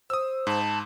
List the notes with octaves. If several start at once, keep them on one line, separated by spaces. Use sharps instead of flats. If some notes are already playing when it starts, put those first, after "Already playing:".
C5 D#6 E6
G#2 A5 B5